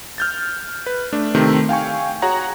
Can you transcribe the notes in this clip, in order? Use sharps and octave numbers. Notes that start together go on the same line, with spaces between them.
F6 G6 A6
B4
A3 D4
C3 D#3 A3 C4
F5 G5 G#5 C#6
F#4 G#4 C#5 F#5 A#5